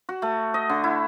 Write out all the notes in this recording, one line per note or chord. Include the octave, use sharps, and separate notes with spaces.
F#4
A3
D#5
D3
E4